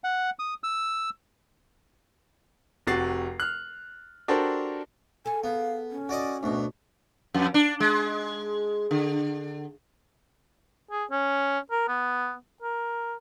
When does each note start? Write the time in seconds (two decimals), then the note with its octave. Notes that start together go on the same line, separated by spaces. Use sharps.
0.04 F#5
0.39 D#6
0.64 E6
2.87 F1 C3 F#4 A6 C7
3.40 F6 F#6
4.28 D4 F#4 G4 A4 A#4 C5
5.26 G#4 A4 G#5
5.44 B3 F5
5.91 C#4
6.09 F#4 D5 D#5
6.43 D2 B2
7.34 F2
7.54 D4
7.80 G#3
8.91 D3
10.91 G#4
11.11 C#4
11.71 A#4
11.88 B3
12.62 A#4